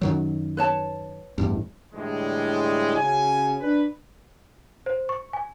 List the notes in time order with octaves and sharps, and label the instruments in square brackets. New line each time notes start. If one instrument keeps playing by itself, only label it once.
[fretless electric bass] F#2 D#3 F#3
[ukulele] B4 C#5 A5
[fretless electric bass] A1 E2 G2
[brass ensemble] A2 D3 E3 G3 G#3
C#3 C#4 F#4 G#5
D4 B4
[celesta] C5
C#6
G#5